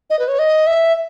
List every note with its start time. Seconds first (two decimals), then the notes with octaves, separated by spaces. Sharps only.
0.10 D#5
0.19 B4
0.28 C#5
0.39 D#5
0.67 E5